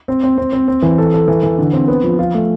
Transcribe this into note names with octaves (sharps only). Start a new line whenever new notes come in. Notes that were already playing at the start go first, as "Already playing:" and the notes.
C4
C4
C4
C4
C4
E3
A4
A4
E3
E3
D3
C4
B3
F3
F4
A3